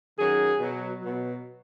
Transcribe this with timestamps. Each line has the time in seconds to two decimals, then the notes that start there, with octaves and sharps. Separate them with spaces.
0.19 F#2 D#3 F#3 G#4
0.59 B2 F#3
1.00 B2 F#3